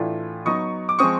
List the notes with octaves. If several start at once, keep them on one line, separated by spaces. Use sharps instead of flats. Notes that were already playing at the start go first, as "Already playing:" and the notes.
Already playing: A2 E3 A3 D4 F4
F#3 B3 D#4 C#6 D#6
D6
F3 G#3 C4 C#6 D#6